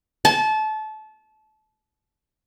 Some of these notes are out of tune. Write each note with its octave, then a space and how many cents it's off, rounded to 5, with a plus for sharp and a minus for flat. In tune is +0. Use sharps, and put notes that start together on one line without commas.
A5 -25